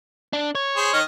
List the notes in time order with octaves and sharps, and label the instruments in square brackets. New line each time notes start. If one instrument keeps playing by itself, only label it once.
[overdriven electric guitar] D4
C#5
[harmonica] G#4 C5
D#3 D#5 F6